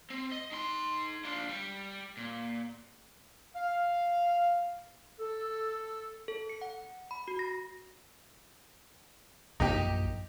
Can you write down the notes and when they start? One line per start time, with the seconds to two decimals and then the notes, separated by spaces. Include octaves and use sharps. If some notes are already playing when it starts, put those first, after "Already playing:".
0.10 C4
0.32 D#5
0.52 D#4 C6
1.25 D4 F4
1.49 G3
2.17 A#2
3.56 F5
5.20 A4
6.28 A4
6.49 C#7
6.61 F#5
7.11 B5
7.28 F#4
7.39 A#6
9.60 A#1 F#2 D#4 G4